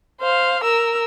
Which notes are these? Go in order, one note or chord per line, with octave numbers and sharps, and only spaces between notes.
C5 F5
A#4 E6